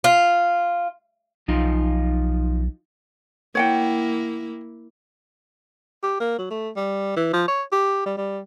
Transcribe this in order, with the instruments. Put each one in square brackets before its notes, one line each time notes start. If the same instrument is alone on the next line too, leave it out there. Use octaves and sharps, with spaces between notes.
[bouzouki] F4
[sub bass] B1 [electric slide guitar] F3 D#4 F4
[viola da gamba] A#3 E4 [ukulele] C#5 F#5 G5
[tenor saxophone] G4
A#3
F#3
A3
G3
E3
F3
C#5
G4
G3
G3